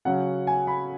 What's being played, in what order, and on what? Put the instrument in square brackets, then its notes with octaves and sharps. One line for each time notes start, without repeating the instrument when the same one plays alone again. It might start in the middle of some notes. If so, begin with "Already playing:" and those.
[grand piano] C#3 F#3 C#4 F#5
G#5
B5